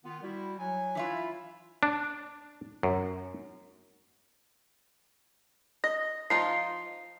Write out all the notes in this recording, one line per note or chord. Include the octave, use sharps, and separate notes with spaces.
D#3 B3 F4
G3 E4 F#4
F#3 G#5
E3 E4 F4
D4
F#2
D#5 A#6
F3 D#4 F4 C7